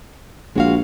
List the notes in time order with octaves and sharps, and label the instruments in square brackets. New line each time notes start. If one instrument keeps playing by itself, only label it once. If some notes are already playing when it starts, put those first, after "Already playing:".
[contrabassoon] A#1 [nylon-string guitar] G#3 F#4 F5